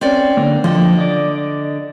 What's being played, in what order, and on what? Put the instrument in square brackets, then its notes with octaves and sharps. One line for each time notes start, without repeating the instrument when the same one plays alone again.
[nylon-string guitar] C4 C#4 D5
[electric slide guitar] D3 A#3
[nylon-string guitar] D3 [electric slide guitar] F3 D#5 G5
[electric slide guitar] D5 D#5